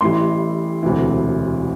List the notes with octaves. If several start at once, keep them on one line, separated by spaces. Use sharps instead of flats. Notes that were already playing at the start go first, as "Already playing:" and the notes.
A1 A2 E3 G3 C6
E1 D2 C3 E3